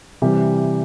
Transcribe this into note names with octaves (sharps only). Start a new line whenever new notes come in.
C3 E3 G3 G4